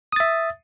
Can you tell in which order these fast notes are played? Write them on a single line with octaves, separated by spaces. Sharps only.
D#6 A6 E5